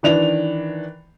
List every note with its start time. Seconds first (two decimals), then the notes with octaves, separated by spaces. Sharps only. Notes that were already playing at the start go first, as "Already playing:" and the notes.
0.03 D#3 E3 D4 F7